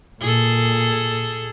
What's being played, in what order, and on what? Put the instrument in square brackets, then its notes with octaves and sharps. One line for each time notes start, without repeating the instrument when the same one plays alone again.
[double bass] A#2 [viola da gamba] G#4 A4